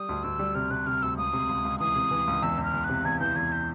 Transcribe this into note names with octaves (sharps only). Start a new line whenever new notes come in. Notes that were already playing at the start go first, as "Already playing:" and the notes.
Already playing: G3 D#6
D2
D2 E6
G3
C3 F6
C3 F#6
C3 F6
D2 E6
C#2 D#6
C3
C#2
C#2
E3 D#6
C3
E3
C#2
E2 E6
E2
F6
E2
F#6
C3
E2 G#6
E3 G6
E2 G#6
G6